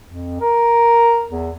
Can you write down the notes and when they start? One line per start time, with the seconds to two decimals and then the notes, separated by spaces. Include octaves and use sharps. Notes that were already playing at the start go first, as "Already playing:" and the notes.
0.07 F2
0.40 A#4
1.30 E2